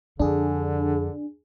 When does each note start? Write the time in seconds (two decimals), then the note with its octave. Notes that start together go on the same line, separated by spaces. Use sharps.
0.20 F2 D3 D4 G#4